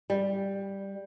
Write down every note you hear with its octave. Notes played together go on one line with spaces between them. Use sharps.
G3